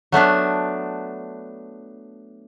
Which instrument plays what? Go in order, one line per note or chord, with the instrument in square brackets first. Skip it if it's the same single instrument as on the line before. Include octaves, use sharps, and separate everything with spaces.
[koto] F#3 A3 B3 D4